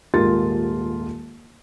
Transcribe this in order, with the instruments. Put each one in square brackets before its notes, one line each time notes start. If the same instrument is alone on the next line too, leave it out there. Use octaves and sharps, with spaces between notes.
[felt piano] D#1 G#2 F4 G4 A#4 A6